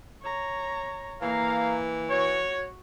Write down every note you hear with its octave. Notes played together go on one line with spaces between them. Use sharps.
C#5 A#5
E3 A#3 F5 A#5
F#4 C#5